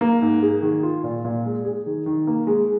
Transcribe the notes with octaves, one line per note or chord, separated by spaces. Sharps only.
A#3
G#2
G#4
D#3
F4
A#2
A#2
G#3
G#4
D#3
D#3
A#3
G#3